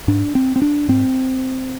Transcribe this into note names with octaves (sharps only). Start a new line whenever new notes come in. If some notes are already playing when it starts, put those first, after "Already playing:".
G#2 D4
C4
C4
D4
G#2 C4